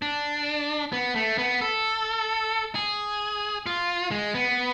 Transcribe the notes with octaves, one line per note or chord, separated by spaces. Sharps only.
D4
B3
A3
B3
A4
G#4
F4
G#3
B3